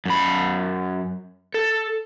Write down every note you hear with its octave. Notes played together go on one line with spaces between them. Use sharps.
F#2 B5
A4